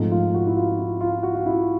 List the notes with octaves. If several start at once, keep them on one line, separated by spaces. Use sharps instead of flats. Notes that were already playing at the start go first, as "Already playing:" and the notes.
Already playing: G#2 F3 A3 C4
F4
F#4
E4
F4
E4
F4
F#4
F4
E4